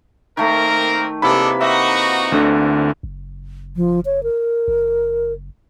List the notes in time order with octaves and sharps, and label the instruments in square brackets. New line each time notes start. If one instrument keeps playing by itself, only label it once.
[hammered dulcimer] D#3 A3 [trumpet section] A#3 C4 A#4
[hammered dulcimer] C3 E3 A#3 [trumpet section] G#3 D4 A4 [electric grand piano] B5
[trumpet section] D#4 F#4 [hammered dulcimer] E5
[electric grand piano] D2 D3
[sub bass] F#1
[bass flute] F3
C#5
A#4
[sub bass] F#1